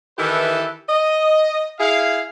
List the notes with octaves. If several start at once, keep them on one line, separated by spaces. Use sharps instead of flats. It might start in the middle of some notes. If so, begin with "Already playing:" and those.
D#3 E3 E4 G4 A4 B4
D#5
E4 G#4 F5